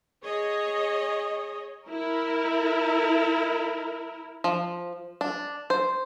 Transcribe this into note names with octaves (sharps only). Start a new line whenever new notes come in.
G#4 C#5 D#5
E4 A#4
F3
D4
C5